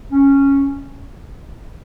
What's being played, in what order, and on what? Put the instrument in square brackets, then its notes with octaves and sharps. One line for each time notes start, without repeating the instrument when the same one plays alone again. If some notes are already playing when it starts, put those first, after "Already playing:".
[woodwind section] C#4